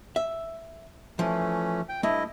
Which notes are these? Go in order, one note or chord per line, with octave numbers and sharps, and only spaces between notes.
E5
E3 F3 A3 C#4
G5
G2 A3 E4 D#5